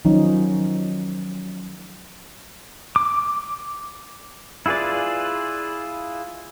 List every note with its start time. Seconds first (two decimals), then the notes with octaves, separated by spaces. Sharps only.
0.05 D#3 F3 F#3 C#4 D#4
2.96 D6
4.66 E4 F4 G#4 B4 D5